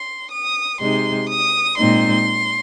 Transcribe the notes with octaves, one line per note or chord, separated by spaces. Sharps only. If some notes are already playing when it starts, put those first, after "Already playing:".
Already playing: C6
D#6
C3 G#3 D#4 C6
D#6
A#2 G#3 C4 D#4 C6